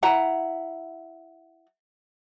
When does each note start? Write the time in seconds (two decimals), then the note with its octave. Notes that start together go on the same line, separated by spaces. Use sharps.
0.03 E4 F#5 A#5